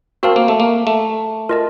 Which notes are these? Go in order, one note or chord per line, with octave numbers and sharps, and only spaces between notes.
C4 F#4 A#4 F5 A5
A#3
A3
A#3
A3
F4 A#4 D#5 A5